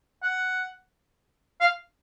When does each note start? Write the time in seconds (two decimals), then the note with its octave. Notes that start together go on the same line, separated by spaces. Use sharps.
0.23 F#5
1.61 F5